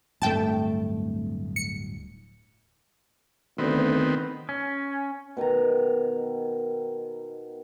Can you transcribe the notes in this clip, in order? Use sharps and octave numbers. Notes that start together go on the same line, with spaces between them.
D1 G2 A3 G5 A5
C#7
D2 D#3 B3 C4
C#4
B2 D#3 G#5 A#5